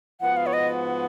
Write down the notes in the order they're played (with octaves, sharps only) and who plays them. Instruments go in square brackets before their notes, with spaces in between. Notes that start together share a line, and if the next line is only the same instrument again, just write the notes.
[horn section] G#2 F3 B3 F#4 [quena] F#5
[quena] F5
C#5
D#5